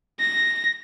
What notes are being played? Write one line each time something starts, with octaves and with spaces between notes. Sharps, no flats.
A#6